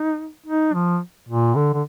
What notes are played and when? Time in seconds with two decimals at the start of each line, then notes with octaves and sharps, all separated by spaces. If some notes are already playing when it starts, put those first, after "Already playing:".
Already playing: D#4
0.46 D#4
0.74 F3
1.29 A#2
1.55 D3
1.73 D3